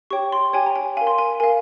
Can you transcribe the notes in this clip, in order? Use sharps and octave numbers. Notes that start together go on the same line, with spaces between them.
G4 C#5 G5 C#6
C6
G4 C#5 G5 G#5
A#5
G#5
A#4 F5 G#5
C6
G#5
A#4 F5 G#5